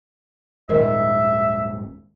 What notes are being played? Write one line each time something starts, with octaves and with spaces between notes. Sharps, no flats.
D#1 G#1 G#2 D#3 A#4 D#5 E5